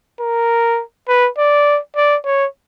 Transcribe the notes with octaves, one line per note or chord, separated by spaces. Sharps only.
A#4
B4
D5
D5
C#5